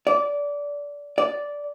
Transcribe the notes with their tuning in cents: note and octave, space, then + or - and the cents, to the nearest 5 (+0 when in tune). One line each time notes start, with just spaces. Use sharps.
D5 -20
D5 -10